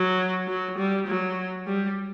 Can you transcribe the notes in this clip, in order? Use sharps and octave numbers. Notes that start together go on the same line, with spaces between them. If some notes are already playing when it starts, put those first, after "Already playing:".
Already playing: F#3
F#3
G3
F#3
G3